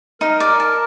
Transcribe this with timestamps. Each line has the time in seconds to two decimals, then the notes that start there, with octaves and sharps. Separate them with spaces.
0.21 D#4 A#4
0.40 D5
0.60 A5